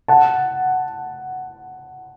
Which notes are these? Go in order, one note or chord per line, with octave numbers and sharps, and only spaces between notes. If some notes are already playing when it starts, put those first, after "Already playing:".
F#5 A5